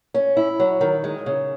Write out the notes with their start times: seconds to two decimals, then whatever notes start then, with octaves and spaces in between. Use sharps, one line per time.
0.14 C#4
0.37 E4
0.60 F#3
0.81 D#3
1.04 G#3
1.26 C#3